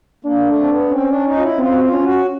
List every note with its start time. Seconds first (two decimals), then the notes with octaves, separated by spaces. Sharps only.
0.25 A#3 D4
0.47 A3
0.60 C4
0.69 B3
0.91 C4 C#4
1.08 D4
1.26 D#4
1.36 F4
1.42 E4
1.58 C4 F4
1.72 F#4
1.81 F4
1.92 C#4
2.03 F#4